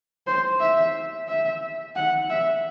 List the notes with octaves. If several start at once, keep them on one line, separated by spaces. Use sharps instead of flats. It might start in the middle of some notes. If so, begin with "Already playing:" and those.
C5
E5
E5
F#5
E5